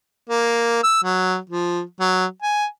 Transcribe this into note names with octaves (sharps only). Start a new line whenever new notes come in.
A#3
E6
F#3
F3
F#3
G#5